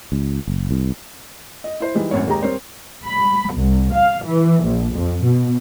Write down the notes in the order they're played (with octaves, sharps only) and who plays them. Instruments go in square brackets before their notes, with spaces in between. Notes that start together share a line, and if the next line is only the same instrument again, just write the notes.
[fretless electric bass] C#2
F#1
C2
[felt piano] D#5
E4 C5
E3 G3 G#3 D#4
G#1 F#2 A2 C#5
D#2 G#3 G4 A#5
G3 C4 A#4 C5 C#5
[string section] B5
C2
F5
E3
A#1
F2
B2